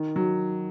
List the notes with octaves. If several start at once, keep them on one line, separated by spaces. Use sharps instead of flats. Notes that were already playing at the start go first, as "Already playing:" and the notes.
Already playing: D#3
F#3